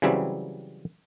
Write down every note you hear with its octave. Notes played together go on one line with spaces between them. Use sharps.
C#3 E3 F#3 G3 C4